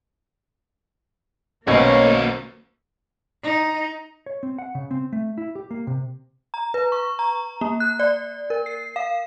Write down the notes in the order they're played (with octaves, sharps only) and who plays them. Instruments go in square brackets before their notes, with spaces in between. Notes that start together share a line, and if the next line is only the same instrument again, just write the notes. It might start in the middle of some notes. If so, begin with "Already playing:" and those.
[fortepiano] B1 B2 C#4 [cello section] A#3 [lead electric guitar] F#4 C5 [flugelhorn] C#5
[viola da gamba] D#4
[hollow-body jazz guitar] C#5
C4
F#5
C#3
C4
A3
E4
G4
A#3
C3
[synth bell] A#5
B4
C#6
A#5
A#3
F#6
D5
A#4
C7
F5